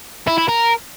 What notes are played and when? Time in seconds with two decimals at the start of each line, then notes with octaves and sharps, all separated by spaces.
0.27 E4
0.38 E4
0.48 A#4